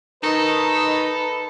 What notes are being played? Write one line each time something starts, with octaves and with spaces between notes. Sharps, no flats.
D#3 D#4 A4 B4